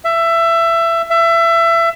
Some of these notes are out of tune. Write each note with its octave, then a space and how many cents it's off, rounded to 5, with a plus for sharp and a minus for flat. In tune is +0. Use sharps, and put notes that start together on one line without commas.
E5 +20
E5 +25